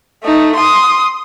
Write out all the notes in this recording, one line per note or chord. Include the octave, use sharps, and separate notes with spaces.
A3 D#4
C6 D#6